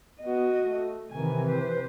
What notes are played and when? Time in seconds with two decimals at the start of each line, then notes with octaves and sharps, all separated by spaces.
0.21 B3 F#4 D#5
0.58 A3
1.11 C3 D#3 E3 A#4 G#5
1.47 B4 C5